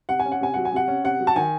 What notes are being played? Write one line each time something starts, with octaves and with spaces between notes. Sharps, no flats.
C3 F#5
G#5
C#4
F#5
C3 G#5
F#3 F#5
G#5
C3 F#5
C#4
C3 F#5
F#3
A5
D#3 G#5